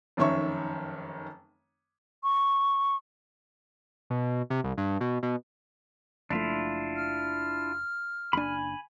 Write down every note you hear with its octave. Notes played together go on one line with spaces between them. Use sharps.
F1 F#2 D#3 C#5 E5 C#6
C#6
B2
C3
C2
G2
B2
B2
F#1 F3 A3 D4 E4 F4
F6
F#1 D4 G#5 B5